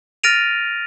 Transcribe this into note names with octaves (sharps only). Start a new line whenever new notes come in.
F6 A6 A#6 D7 D#7 F7